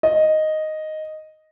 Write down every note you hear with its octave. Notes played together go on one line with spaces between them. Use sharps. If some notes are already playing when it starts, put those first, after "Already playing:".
D#5